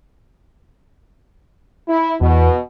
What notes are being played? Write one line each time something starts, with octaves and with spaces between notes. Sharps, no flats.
E4
E2 B2